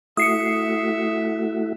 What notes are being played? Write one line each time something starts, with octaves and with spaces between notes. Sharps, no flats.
A3 E4 F#4 E5 D#6 C7 C#7